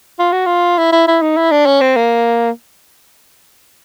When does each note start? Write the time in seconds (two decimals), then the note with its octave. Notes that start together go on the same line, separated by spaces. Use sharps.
0.19 F4
0.32 F#4
0.46 F4
0.78 E4
0.92 E4
1.07 E4
1.22 D#4
1.37 E4
1.52 D4
1.66 C#4
1.81 C4
1.96 A#3